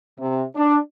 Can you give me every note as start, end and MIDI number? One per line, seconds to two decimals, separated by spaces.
0.19 0.44 48
0.56 0.77 62